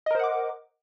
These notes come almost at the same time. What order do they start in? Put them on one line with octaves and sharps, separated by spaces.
D#5 A#4 C5 F#5 D6